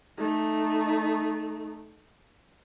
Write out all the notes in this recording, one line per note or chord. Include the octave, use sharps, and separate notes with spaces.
A3 D#4